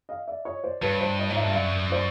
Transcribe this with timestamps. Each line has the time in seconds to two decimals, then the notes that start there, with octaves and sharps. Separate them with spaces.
0.09 D#5 F5
0.28 D5 E5
0.45 C#5 D#5
0.64 C5 D5
0.82 G2 B4 C#5
1.01 C5 D5
1.19 C#5 D#5
1.30 G#2 D#5
1.37 D5 E5
1.43 G2
1.49 F5
1.55 F#2 D5 E5
1.92 C5 D5